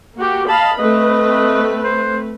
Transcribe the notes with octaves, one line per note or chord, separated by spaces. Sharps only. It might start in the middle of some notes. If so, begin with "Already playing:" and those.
A#3 F#4 G4
D#5 F5 A5 B5
A3 C4 B4 D#5
C5